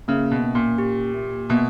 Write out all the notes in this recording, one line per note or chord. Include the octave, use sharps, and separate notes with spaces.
C#3 A#3
B2
C#4
A#2
G4
A#3
B2 A#3